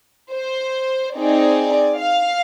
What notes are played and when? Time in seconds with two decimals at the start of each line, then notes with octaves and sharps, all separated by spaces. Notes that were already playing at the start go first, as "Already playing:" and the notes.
0.31 C5
1.15 C4 D#4 G#4 D5
1.98 F5